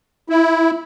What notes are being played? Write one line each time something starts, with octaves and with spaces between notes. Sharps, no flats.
E4